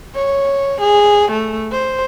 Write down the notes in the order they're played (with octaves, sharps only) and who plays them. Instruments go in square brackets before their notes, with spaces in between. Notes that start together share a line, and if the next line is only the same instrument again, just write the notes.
[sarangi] C#5
G#4
A3
C5